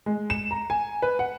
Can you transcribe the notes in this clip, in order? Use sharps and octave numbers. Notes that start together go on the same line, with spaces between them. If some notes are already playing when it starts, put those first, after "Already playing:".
G#3
E7
A#5
G#5
B4
F#5